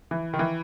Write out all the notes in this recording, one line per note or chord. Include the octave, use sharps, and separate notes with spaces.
E3
D#3
E3